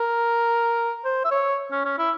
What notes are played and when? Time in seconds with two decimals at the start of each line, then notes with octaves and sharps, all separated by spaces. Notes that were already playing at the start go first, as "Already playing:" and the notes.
Already playing: A#4
1.05 C5
1.25 E5
1.31 C#5
1.71 C#4
1.85 C#4
1.98 E4